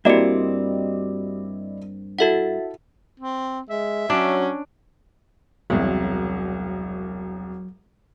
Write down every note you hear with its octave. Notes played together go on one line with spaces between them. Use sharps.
G2 A#3 C4 E4 F#4 G4 D5 D#5
E4 F#4 A4 E5 F#5
C4
G#3 E5
F#3 C#4 D4
E1 C2 F#3